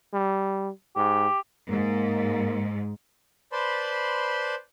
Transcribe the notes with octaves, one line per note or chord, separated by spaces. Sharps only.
G3
G#2 G4
G#2 A#3
B4 C5 D5 A5 B5 C6